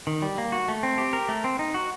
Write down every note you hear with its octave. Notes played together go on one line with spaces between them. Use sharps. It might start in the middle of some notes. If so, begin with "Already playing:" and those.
D#3
G3
A#3
F#4
A3
C4
G4
A#4
A3
C4
D#4
F#4